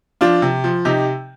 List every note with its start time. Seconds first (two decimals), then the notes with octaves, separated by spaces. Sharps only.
0.21 F3 D4 F4
0.42 C3
0.64 F3
0.85 C3 D#4 G4